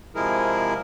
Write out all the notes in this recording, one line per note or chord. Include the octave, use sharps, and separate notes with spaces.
C3 F3 G#3 E4 G#4 A#4